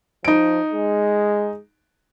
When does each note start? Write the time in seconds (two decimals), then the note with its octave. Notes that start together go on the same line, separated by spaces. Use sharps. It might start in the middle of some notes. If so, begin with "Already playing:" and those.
0.25 F3 D#4 D7
0.73 G#3